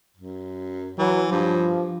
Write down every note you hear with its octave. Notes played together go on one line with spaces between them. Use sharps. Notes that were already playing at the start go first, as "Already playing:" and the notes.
F#2
E3 F#3
G2 F3